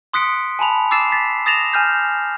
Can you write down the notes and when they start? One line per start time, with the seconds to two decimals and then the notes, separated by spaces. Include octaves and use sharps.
0.13 C6 D#6 F#6 B6 C#7 D7
0.59 G#5 A5 B5 F7
0.91 D6 E6 A6 C7 E7
1.12 A6 B6 C7
1.46 D#6 A6 A#6 E7 F7
1.73 G#5 F6 G6 C7